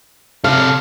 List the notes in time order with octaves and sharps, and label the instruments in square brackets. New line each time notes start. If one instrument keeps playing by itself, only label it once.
[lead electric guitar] C3 A4 [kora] F5